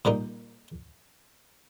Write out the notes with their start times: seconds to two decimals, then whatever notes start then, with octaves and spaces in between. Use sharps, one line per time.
0.05 A#2 G3 A#3 D#4